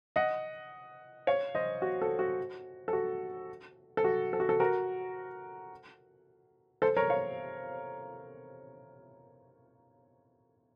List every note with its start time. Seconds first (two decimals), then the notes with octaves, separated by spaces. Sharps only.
0.16 D#5 F#5
1.27 C#5 F5
1.55 C5 D#5
1.82 F#4
2.02 A4
2.19 F#4
2.88 A4
2.93 F#4
3.97 A4
4.04 F#4
4.33 A4
4.40 F#4
4.49 A4
4.60 F#4 A#4
6.82 A4 C5
6.97 A#4 C#5
7.10 C#5 F5